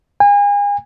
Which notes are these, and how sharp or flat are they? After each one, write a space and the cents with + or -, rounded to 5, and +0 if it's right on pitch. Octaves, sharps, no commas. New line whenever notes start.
G#5 -35